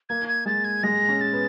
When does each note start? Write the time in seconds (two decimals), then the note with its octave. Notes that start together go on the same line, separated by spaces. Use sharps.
0.09 A#3 G#6
0.28 G#6
0.46 G#3 A6
0.65 G#6
0.83 G#3 A#6
1.09 C#4
1.21 A6
1.33 B3